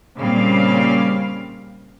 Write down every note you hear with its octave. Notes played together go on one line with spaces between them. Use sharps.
A#2 C#3 G3 C4 F5